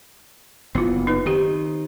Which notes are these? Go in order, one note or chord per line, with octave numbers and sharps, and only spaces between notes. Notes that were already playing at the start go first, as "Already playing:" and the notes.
F#1 B3 E4 F4
D#4 B4
D#3 C4 G4 C5